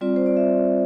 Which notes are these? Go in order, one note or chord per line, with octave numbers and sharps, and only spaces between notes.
G3 C4 F4 D5
C5
D5
E5